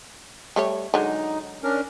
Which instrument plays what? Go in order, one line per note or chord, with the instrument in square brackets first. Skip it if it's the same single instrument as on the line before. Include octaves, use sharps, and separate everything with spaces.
[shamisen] G3 A3 C#5
[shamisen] D3 F#3 G#3 [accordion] D#4
[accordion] C#4 D4 A#4